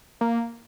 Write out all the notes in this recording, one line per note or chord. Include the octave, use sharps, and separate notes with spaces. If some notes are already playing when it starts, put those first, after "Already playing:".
A#3